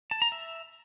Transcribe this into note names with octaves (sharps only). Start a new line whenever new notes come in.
A5
A#5
E5